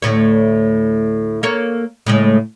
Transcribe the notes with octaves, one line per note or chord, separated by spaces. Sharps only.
D2 A2 C#5
A#3 A4 C#5
A2 C#3 G#3